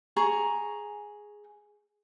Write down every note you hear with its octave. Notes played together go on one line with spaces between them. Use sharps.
G#4 A#5 C#6